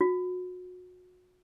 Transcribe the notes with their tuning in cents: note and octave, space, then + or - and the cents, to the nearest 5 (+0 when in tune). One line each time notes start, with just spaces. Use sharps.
F#4 -30